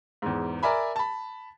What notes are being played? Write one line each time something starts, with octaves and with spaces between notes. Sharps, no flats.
E2 G#2
A#4 D5 E5 G#5 B5
A5 B5